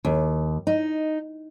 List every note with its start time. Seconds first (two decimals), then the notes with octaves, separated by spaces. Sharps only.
0.05 D#2
0.67 D#4